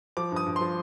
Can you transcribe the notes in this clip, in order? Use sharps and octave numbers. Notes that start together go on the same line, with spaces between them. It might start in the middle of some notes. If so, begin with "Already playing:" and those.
F3 D6
G2 D#6
G2
C6
F3